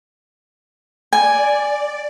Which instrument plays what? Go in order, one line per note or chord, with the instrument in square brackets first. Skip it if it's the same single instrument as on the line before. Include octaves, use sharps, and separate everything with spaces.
[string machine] D5 [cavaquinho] G#5